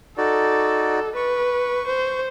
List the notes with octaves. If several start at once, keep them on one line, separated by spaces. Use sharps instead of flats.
D#4 F#4 A4 D5
B4 C#6
C5